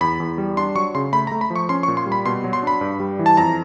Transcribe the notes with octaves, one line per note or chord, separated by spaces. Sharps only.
E2 B5
E2
G3
D4 C6
F#3 C#6
C#3 C6
A3 B5
A#5
A3
B5
F3
C#6
C#4 C6
C#6
A#2
C6
G3
B5
B2 C6
F#3
C6
D4 B5
G2
G3
E3
A5
F2 A#5